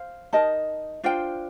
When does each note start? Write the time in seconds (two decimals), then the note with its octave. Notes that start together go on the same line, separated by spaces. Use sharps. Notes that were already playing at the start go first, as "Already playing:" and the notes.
Already playing: C5 F5
0.33 D#4 A#4 D#5 A5
1.04 D4 F4 C5 G5